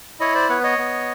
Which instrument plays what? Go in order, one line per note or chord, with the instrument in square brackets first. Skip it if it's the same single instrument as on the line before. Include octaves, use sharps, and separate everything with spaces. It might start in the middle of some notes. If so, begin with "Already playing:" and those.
[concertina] E4 C#5 D#5
C5 D5
B3 B4 C#5
C#5 D#5
B3